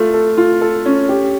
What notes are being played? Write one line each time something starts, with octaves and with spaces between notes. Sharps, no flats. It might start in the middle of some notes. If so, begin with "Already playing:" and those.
Already playing: A3 F4
A4
F4
A4
C#4
G4